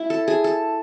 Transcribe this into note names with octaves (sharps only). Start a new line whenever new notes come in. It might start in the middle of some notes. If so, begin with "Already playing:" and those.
Already playing: A3 E4
A4
G#4
A4